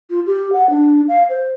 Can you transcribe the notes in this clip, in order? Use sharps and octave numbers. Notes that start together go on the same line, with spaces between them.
F4
G4
F#5
D4
F5
C5